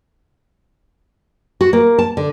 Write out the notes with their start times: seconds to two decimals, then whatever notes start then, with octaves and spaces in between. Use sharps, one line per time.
1.61 F#4
1.73 A#3
1.98 A5
2.17 D3